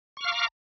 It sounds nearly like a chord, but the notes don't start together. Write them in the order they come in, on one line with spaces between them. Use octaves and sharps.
C#6 F6 F5 D6 A#5